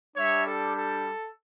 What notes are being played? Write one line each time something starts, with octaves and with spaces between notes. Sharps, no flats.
G3 D4 G4 C#5 E5
A4
A4